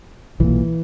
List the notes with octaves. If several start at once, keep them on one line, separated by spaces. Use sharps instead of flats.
B1 A#2 E3